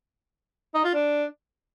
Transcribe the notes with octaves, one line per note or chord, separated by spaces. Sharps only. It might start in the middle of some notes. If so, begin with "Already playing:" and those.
D#4
F4
D4